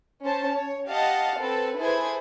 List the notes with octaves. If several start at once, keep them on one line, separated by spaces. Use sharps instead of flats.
C#4 C5 A5
C#5
G4 D#5 F5 F#5 A5
C4 A4 B4
E4 G#4 A4 B4 C5 G#6